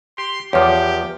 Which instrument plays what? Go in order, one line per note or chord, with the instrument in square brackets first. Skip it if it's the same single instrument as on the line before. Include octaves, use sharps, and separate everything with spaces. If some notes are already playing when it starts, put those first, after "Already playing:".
[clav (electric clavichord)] G4 [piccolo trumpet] C6
[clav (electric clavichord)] E2 F3 [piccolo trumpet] G4 [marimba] C#5 D6